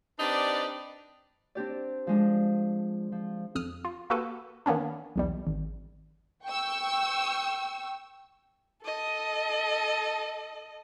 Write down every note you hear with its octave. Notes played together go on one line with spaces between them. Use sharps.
C4 D4 D#4 G4 B4 D5
C4 D4 G4 D5
F3 G#3 D4
F3
F2 D#6 F6
F4
A#3 F#4 G4 A4 B4
D#3 A#3 B3 C#4 D4
B1 E2 G3
G#1
G5 C#6 E6
A4 D#5